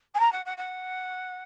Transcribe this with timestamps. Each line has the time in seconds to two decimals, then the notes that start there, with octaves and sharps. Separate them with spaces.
0.14 G#5
0.20 A#5
0.32 F#5
0.45 F#5
0.57 F#5